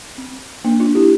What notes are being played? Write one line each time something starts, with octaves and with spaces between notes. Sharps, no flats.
C4
A#3 D4
D4 F4
E4 G4